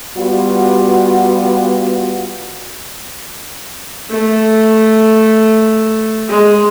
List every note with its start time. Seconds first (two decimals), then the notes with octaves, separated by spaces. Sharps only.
0.17 G3 B3 F4 F#4
4.09 A3
6.28 G#3